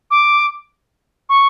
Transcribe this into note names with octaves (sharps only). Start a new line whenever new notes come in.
D6
C#6